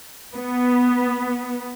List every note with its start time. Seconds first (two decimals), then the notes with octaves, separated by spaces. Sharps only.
0.33 B3